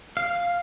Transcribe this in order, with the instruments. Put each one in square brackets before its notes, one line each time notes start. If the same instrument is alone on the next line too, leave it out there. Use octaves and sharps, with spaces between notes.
[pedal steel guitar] F5